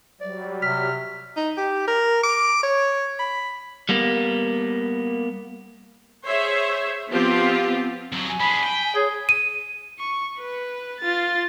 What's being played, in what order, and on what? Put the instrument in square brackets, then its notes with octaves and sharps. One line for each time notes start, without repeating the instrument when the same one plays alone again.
[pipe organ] F#3 G3 [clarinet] D5
[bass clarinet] C3 [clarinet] F6 [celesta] B6
[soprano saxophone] D#4
G4
A#4
D6
C#5
B5
[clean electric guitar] G3 A#3 B3
[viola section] G#4 C5 C#5 E5
F3 B3 C4 F4 G4
[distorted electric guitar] F2 F#3
[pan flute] G#5
[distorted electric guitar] G#3 D4 [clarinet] B5
[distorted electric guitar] G5
[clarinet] G#4 [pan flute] C#5
[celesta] D#7
[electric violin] C#6
B4
F4 A6